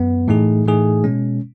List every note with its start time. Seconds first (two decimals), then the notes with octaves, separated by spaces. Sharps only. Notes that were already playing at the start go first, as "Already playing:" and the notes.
Already playing: F#2 B3
0.28 A2 E3 A3 D#4 G#4
0.66 A2 E3 A3 D#4 G#4
1.04 B2 G#3 C#4